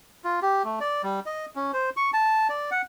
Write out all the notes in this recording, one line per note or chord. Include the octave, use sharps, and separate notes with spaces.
F4
G4
A3
D5
G3
D#5
C#4
C5
C#6
A5
D5
F#5